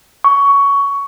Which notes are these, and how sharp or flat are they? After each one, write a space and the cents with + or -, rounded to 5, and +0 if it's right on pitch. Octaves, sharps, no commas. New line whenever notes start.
C#6 +15